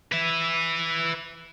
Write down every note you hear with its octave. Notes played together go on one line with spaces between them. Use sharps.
B4 E5